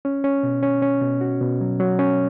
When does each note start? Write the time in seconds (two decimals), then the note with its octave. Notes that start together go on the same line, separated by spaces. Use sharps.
0.05 C#4
0.24 C#4
0.43 B2
0.63 C#4
0.82 C#4
1.02 B2
1.21 F#4
1.41 B2
1.61 F#3
1.80 F#3
1.99 C#4